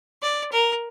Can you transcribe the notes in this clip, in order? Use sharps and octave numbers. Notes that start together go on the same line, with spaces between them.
D5
A#4